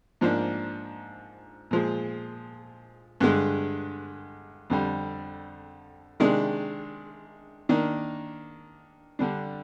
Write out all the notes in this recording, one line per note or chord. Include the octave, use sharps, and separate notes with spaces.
G#2 F3 A#3 D4
A#2 F3 G#3
G2 D3 G#3
F2 D3 G3
C3 D#3 G#3 D4
D#3 A#3 D4
D3 G3 D4